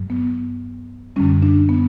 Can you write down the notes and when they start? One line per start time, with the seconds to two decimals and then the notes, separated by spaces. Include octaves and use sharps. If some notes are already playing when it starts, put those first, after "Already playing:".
Already playing: G2 F#3
0.10 B3
1.16 F#2 D3 G3 C#4
1.42 D4
1.69 B3